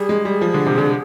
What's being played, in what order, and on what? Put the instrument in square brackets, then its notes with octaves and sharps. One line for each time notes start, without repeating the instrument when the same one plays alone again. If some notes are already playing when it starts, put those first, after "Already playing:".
Already playing: [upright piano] G3 [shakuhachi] G#4
[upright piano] G#3
G3
F3
D3
C3
D3